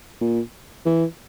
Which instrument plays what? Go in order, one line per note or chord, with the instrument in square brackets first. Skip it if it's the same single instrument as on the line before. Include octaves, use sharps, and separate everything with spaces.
[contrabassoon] A#2
E3